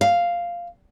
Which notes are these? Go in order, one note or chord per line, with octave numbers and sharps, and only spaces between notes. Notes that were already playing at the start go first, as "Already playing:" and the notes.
F5